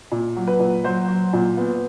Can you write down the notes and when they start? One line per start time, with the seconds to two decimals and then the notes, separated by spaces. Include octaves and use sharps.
0.12 A#2
0.36 F#3
0.47 B4
0.60 A#2
0.84 F#3 C5
1.08 F#3
1.33 A#2
1.57 B3